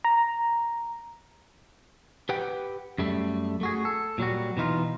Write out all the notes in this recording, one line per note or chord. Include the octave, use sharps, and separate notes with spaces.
A#5
G4 B4 F#5 G5
F#2 G3 A3
A3 F#4 G#4
A4
A#2 F#3 G3 F#4
B2 E3 D#4 F4